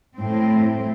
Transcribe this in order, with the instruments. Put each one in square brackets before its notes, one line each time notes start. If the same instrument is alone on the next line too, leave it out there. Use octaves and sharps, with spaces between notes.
[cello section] A2 C4